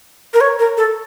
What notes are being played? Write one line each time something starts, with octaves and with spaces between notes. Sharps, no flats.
A#4
C#5
A#4
A4